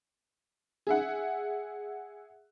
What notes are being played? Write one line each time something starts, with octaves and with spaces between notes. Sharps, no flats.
G#4 E5 F#5